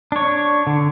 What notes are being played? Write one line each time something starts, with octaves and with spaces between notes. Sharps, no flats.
D4 C#5
D3